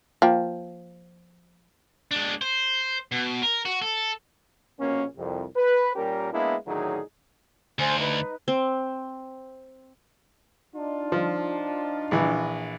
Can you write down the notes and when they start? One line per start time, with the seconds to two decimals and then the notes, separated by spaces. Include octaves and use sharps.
0.22 F3 A#3 G5
2.11 G#3 D4
2.42 C5
3.12 B2
3.43 A#4
3.65 F#4
3.82 A4
4.80 A#1 B2 A#3 C#4
5.17 C2 F2
5.57 B4
5.96 A#2 G3 C#4 G4 A#4
6.33 G#3 A#3 B3 D4 E4
6.68 A2 D3 D#3 F#3 D#4 G#4
7.79 D2 C5 G#5
7.99 D#4 B4
8.48 C4
10.75 D4 D#4 F4
11.12 F3
12.11 A#1 E3